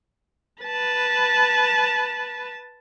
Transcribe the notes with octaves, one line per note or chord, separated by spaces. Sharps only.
B4 A5